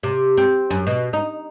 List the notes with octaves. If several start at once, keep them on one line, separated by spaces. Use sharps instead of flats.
C3
C4
F#2
B2
D#4